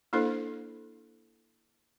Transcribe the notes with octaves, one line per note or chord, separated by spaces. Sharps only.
A#3 D4 E4 A4 C5